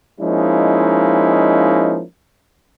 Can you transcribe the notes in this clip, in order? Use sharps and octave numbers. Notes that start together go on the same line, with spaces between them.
F3 G#3 A#3 C#4 D#4 E4